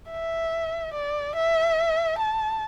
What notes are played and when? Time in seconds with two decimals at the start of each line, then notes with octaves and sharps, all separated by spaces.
0.10 E5
0.94 D5
1.36 E5
2.19 A5